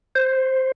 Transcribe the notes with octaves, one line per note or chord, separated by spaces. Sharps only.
C5